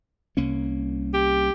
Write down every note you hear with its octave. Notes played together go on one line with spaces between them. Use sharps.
C2 A#3 C#4
G4